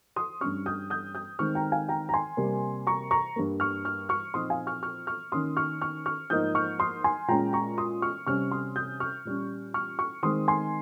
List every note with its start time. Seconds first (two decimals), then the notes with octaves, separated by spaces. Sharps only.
0.16 C6 D#6
0.41 G2 G3 C#4 C#6 F6
0.66 D#6 G6
0.90 D#6 G6
1.15 D#6 G6
1.39 D#3 G#3 C4 C#6 F6
1.55 G5 A#5
1.72 F5 G#5
1.89 G5 A#5
2.09 A#5
2.14 G#5 C6
2.37 C3 G3 A#3
2.87 A#5 C#6
3.11 A#5 C#6
3.36 G2 G3 A#3
3.60 C#6 F6
3.85 C#6 F6
4.09 C#6 F6
4.34 A#2 F3 C4 D#4 C6 D#6
4.50 F5 G#5
4.67 C#6 F6
4.83 C#6 F6
5.07 C#6 F6
5.32 D#3 A#3 C#4 C6 D#6
5.57 C#6 F6
5.81 C#6 F6
6.06 C#6 F6
6.30 G#2 F3 A#3 D#4 D#6 G6
6.55 C#6 F6
6.79 C6 D#6
7.04 G#5 C6
7.28 A#2 G#3 C#4 G5 A#5
7.53 A#5 C#6
7.78 C6 D#6
8.02 C#6 F6
8.26 C3 G3 C#4 C#6 F6
8.51 C6 D#6
8.76 D#6 G6
9.00 C#6 F6
9.25 A#2 G3 C#4
9.74 C#6 F6
9.99 C#6 F6
10.23 D#3 G#3 C4 C6 D#6
10.48 G#5 C6